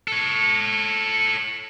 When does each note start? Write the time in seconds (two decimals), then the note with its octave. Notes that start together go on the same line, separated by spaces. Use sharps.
0.08 A4 C#5